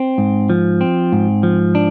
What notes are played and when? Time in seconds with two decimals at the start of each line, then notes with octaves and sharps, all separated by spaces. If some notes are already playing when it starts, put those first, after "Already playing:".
Already playing: C4
0.18 G#2
0.50 F3
0.81 C4
1.12 G#2
1.43 F3
1.75 D4